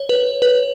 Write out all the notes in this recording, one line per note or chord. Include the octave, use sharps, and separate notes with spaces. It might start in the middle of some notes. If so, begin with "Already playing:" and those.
Already playing: C#5
B4
B4